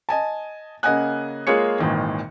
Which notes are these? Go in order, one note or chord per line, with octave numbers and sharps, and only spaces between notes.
D#5 G#5 A5
C#3 A#3 D#5 F#5 G#5 F#6
G#3 A#3 F4 G#4 C#5 C#7
G#1 A#2 D#3 E3